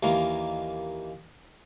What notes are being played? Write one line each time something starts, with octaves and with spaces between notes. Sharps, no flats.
D#2 E3 A#3